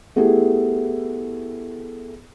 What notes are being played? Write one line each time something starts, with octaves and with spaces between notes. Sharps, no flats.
A3 B3 E4 G4 G#4